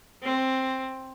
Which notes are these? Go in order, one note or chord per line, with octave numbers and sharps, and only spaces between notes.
C4